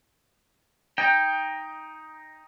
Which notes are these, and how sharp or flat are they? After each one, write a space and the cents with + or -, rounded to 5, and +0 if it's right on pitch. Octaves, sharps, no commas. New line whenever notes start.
D#4 +5 G5 +10